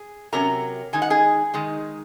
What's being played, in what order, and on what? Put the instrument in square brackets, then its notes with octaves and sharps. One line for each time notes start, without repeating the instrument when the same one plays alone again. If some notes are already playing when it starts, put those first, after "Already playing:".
Already playing: [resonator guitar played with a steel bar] G#4
C3 F#3 C#4 A#4 A#5
D#3 G#3 D#4 G#5
F#5
G#4 G#5
D#3 G#3 D#4